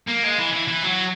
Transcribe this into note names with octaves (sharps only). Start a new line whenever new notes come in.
A#3
G#3
E3
E3
E3
F#3